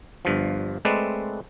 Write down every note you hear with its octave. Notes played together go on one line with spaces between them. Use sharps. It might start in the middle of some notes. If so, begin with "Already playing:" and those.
G1 G2 F3
G#3 A3 C4 B4 D5